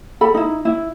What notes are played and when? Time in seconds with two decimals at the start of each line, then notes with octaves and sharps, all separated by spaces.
0.21 A4 B5
0.34 D#4 E4
0.65 E4